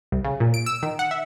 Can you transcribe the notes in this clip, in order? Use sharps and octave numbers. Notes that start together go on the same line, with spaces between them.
C2
C#3
A#2
D7
E6
D#3
F#5
E5